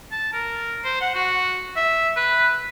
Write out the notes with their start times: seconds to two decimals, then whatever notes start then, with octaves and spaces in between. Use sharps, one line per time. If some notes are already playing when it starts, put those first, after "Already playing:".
0.12 A5
0.33 A#4
0.84 C5
1.01 F#5
1.15 F#4
1.76 E5
2.16 B4